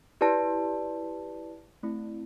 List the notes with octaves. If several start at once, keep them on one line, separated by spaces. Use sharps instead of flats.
E4 G4 B4 D5 A5
A3 C4 E4